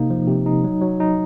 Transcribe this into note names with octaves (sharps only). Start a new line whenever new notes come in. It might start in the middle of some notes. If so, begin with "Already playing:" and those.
Already playing: C3 A#3 D#4
F3
C3
D#4
F#3
F#3
D#4